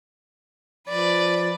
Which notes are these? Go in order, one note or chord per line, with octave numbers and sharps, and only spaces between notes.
F3 B4 D5